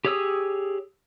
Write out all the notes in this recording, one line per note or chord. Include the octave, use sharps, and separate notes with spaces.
G4 G#4 C#5 D#6 E6